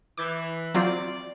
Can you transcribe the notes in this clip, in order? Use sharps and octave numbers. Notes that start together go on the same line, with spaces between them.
E3 D6 G6 G#6
F#3 C4 F4 D5